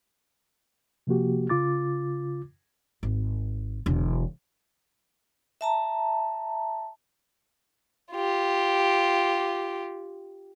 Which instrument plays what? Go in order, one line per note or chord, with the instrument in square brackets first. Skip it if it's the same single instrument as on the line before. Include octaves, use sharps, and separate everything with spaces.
[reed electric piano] C3 F3 A#3 F#4 G4
C#3 F4 D6 A6
[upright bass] G#1
E1 D3
[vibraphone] E5 A5 A#5
[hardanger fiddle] F4 G4